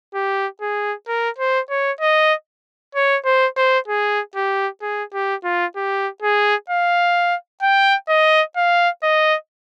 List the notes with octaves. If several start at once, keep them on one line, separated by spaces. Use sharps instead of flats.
G4
G#4
A#4
C5
C#5
D#5
C#5
C5
C5
G#4
G4
G#4
G4
F4
G4
G#4
F5
G5
D#5
F5
D#5